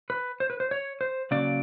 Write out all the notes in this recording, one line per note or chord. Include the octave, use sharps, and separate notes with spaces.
B4
C5
B4
C5
C#5
C5
C#3 F#3 A#3 C#4 D5